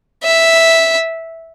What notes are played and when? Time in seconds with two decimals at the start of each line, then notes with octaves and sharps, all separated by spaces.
0.24 E5